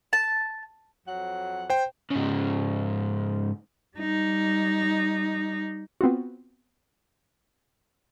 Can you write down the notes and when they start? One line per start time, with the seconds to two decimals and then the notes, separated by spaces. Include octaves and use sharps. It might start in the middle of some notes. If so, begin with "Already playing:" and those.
0.13 A5
1.07 F2 F#3 F#5
1.70 C5 G5
2.11 G#2 C#3
3.98 G3 D#4
6.01 B3 C4 F4 F#4